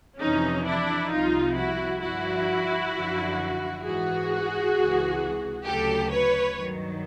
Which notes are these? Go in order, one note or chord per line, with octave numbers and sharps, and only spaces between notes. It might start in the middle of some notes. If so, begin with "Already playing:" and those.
F2 C3 E3 C#4 D#4
D4 E4
C2 C3 F3 D#4 F4
E4 F#4
G2 D3 F3 E4 F#4
F#2 D3 F3
G#2 E3 F#4 G#4
C#2 C3 E3
D2 C#3 F#3 G4 A4
B4 C#5
G2 D#3 F#3